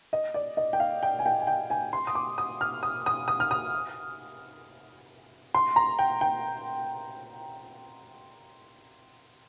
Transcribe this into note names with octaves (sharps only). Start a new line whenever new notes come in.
D#5
D5
D#5
G5
F5
G5
G#5
G5
G#5
G5
G#5
C6
D#6
D6
D#6
F6
D#6
D#6
D#6
F6
D#6
C6
A#5
G5
G5